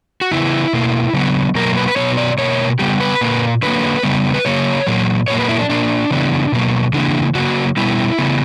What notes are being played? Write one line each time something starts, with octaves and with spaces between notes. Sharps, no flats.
F#4
C#3 E3 B3 E4
B2 A#3
C#3 F#3 B3
B2 F#3 A#3 A#4
B4
B4
B2 F#3 B3 C#5
D5
B2 A#3 C#5
C#3 G3 B3 G4
B4
A#2 A#3
D3 F#3 A#3 B4
C#3 G3 B3
B4
C#3 F#3 A#3 C#5
A#2 F#3 A#3
A#2 F#3 A#3 C#5
B4
E4
D4
A#2 A#3 D4
C#3 E3 G3 B3
B2 F#3 A#3
C#3 E3 A#3 D4
C#3 F#3 A#3 F#4
B2 G3 B3 E4
C#3 E3 G3 B3